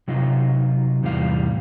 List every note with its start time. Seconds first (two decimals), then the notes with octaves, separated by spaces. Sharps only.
0.08 C3 F#3 D#4 F4
1.03 E2 A2 C3 G3 F5